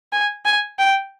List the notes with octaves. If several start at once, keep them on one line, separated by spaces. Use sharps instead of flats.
G#5
G#5
G5